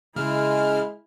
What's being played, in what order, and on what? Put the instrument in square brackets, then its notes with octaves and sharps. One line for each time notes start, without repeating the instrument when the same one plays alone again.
[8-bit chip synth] C#3 F6 [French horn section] G#3 [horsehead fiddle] E4